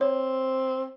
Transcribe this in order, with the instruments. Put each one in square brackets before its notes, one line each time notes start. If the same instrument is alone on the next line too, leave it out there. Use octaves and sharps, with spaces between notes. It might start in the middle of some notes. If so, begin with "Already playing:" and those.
[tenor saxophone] C4 [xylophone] C#5